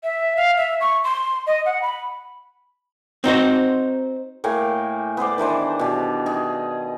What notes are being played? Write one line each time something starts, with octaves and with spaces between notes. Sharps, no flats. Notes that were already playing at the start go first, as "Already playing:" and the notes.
E5
F5
E5
C#6
C6
D#5
F#5
B5
C4 D#4 F#4 C5
A2 A#3 G5 G#5
B3 G#4 C5 D5
D#3 E3 D4 C5
B2 G4
D#4 G#4 D#5